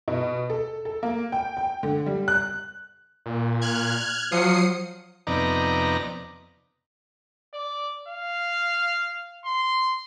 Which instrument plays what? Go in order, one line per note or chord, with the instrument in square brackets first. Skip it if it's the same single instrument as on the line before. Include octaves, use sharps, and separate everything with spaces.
[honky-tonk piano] B2
A4
A4
A#3
G5
G5
D3
G3
F#6
[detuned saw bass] A#2
[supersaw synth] F6 F#6 G#6
[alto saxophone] F3 [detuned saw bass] F#3 [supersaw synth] D#6 C7 C#7
[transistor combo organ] F2 C3 B3 D#4 D5 A#5
[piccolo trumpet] D5
F5
C6